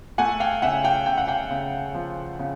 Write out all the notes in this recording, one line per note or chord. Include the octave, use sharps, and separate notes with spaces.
A3 F#5 G#5
F5 G5
C#3 E5 F#5
F5 G5
C#3 G5
F#5
F5 G5
C#3
F3
C#3